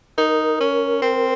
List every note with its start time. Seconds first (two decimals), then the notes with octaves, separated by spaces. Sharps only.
0.18 D#4 A#4
0.60 C#4
1.02 C4